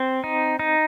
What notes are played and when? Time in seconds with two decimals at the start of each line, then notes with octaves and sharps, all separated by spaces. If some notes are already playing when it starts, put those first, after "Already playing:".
Already playing: C4
0.24 D#4
0.59 D#4